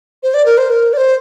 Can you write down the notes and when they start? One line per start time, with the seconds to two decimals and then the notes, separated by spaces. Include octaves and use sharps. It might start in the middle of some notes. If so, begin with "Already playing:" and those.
0.23 C5
0.34 D5
0.46 A#4
0.58 C5
0.70 A#4
0.93 D5
0.97 C5